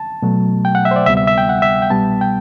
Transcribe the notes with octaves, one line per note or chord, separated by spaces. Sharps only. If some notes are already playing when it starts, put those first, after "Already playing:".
Already playing: A5
B2 F#3 A3
G5
F#5
E5
C5
D5
D2 C3 G3 B3 E5
E5
E5
G5
F#5
E5
G5
C2 B2 G3 B3 A5
G5